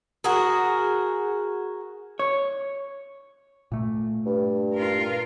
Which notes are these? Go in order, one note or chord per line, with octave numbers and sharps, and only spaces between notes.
F#4 G#4 A#4
C#5
A#2 A3
G2
F4 A#4